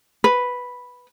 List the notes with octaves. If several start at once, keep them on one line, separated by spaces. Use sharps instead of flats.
B4